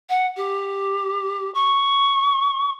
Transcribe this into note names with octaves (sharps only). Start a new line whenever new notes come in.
F#5
G4
C#6